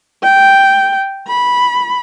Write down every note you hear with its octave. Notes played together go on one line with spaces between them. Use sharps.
G5
B5